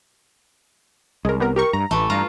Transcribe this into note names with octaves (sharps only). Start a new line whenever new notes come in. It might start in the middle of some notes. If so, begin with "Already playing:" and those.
C2 G#3 A#4
G3 B3 A#4
G4 A#4 C#6
G2 A#5
A1 E3 A3
G2 F4 A#5